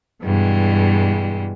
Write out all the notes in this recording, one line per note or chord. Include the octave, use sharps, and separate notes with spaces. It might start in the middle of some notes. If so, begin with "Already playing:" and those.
G2 B2 E3 G3 G#3